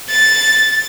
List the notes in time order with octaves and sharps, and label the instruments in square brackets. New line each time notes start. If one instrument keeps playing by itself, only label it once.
[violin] A6